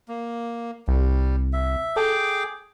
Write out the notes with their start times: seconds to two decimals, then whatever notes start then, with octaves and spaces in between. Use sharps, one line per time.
0.08 A#3
0.88 C2 G3
1.53 E5
1.96 G#4 A4 G5 D6